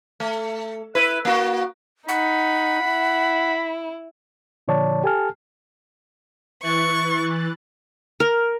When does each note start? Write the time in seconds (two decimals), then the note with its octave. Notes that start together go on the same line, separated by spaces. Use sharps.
0.20 A3
0.95 E4 B4
1.25 A#3 F#4
2.09 D#4 F#5 B5
2.85 E4
4.68 A#2 D3 F3 C#5 D5 A5
5.04 G4 A4 G#5 A5 F6
6.63 E3 C#6 F#6 A6
8.20 A#4